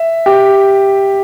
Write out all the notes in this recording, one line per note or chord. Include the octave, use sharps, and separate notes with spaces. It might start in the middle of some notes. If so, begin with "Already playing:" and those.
Already playing: E5
G4